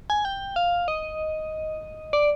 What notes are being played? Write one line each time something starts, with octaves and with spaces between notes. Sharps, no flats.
G#5
G5
F5
D#5
D5